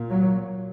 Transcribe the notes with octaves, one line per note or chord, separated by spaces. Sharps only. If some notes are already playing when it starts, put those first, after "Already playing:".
Already playing: A#2
F#3